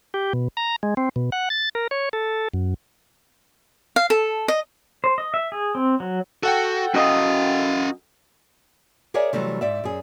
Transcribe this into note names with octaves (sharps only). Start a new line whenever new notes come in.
G4
B2
A#5
G#3
C4
B2
F#5
A6
A#4
C#5
A4
F#2
F5
A4
D#5
C5
D#5
E5
G#4
C4
F#3
F#4 A4 F#5 G5
F#2 F#4 D#5 F5
G#4 A#4 C#5 D5 E5 G#5
C3 E3 F#3 G3 A3
G#2 D5 E5
F#2 G#4